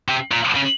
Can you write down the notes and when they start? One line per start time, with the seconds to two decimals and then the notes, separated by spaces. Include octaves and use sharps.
0.09 C3
0.32 A#2
0.56 C#3